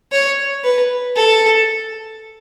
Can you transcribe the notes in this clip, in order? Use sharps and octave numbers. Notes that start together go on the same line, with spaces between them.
C#5
B4
A4